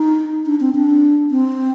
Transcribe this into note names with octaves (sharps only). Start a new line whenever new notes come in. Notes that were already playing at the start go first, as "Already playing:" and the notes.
Already playing: D#4
D4
C4
D4
C4